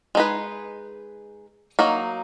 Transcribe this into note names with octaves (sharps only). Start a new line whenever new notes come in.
G#3 D#4 G#4 B4
F#3 A#3 D#4